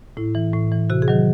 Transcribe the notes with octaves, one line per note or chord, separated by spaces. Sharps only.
A2 E4
E3
A2
E3
C3 F#4
G#4
D#3 F#3